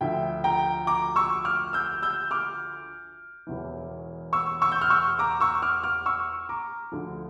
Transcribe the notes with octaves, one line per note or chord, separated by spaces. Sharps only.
D2 D3 F3 E5 G5
G5 A#5
A#5 D6
C#6 E6
D6 F6
E6 G6
E6 G6
D6 F6
E1 E2 E3
C#6 E6
C#6 E6
G6
F6
C#6 E6
A#5 D6
C#6 E6
D6 F6
D6 F6
C#6 E6
A#5 D6
D2 D3 F3